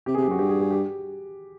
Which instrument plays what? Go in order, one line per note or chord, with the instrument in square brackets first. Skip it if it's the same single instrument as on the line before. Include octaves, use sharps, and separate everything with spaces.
[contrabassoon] C3 [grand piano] G4
[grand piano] G#4
[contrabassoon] C3
[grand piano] G4
[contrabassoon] F#2
[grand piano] F#4
[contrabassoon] G2 [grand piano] G4
[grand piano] G#4
G#4
G4